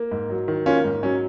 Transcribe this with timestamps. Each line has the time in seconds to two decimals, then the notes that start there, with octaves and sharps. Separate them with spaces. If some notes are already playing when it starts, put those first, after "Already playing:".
Already playing: A#3
0.11 G#2
0.30 F#3
0.48 D#3
0.66 A#3 C#4 F4
0.84 G#2
1.03 F#3 C#4